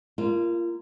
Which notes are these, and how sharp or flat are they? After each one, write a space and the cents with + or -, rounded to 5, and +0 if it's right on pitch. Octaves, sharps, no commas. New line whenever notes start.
A#3 +0 F4 -30